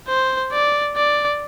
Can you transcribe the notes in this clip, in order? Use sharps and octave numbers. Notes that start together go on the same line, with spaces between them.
C5
D5
D5